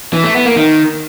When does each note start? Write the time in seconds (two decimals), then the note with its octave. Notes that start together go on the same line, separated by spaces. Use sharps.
0.13 E3
0.24 A3
0.35 B3
0.45 A#3
0.56 D#3